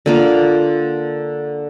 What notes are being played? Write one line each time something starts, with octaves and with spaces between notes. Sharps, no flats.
D3 A#3 F4